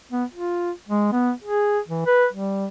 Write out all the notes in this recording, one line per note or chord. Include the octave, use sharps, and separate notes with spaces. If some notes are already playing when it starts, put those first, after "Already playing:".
B3
F4
G#3
B3
G#4
E3
B4
G3